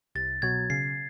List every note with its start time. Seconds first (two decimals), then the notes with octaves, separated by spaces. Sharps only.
0.15 C2 A6
0.42 B2 F#3 G#6
0.70 C#3 C7